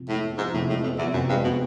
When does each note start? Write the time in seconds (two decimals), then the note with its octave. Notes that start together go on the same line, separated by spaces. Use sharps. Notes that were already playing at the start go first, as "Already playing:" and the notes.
Already playing: C3 F3
0.08 A2 G#3
0.23 B3
0.38 G#2 F3
0.54 A2 C3
0.68 A2 G#3
0.83 F2 B3
0.98 E2 F3
1.13 F#2 C3
1.29 G2 G#3
1.44 B2 B3